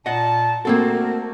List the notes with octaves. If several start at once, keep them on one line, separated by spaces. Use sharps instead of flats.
A#2 D#5 F#5 A5
A3 A#3 C4 F#4 A4 A#4